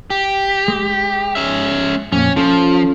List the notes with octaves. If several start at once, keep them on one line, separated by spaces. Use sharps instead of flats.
G4
G#3
C#4 E5
F2 A#2 C#4
F3 C#4 F4 A4